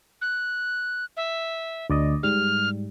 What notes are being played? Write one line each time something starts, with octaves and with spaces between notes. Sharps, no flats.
F#6
E5
D2 D5 D#5
G#2 G3 F6